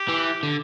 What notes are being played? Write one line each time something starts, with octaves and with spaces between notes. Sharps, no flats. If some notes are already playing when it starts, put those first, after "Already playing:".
Already playing: G4
E3
D3